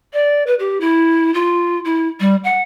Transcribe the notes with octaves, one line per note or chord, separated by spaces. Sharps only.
D5
B4
G4
E4
F4
E4
G3
F#5